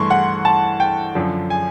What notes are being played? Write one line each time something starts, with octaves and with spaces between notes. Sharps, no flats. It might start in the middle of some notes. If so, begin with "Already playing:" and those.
Already playing: G2 E3 A3 C6 C#6
F#5
A5
G5
F#2 D3 F3
G#5